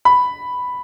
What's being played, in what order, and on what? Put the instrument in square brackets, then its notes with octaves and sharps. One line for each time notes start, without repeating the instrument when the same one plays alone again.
[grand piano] B5